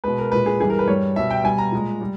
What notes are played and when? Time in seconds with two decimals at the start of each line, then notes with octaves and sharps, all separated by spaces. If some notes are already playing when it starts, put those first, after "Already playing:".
0.04 B2 G#3 B4
0.18 A#4
0.32 A#2 G#3 B4
0.46 G#4
0.60 G2 E3 G3 G#4
0.70 A#4
0.79 B4
0.88 G2 G3 C#5
1.16 B2 G3 E5
1.30 G5
1.44 B2 G3 G#5
1.58 A#5
1.72 A#2 G#3
2.01 G3